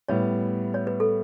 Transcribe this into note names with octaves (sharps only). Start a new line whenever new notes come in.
A2 G3 B3 C#5
C#5
B4
A4